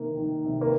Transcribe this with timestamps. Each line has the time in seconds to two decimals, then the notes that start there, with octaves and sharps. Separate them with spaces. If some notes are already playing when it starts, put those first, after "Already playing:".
Already playing: C3 D#3 A#3
0.17 D#3
0.44 C3
0.61 A#3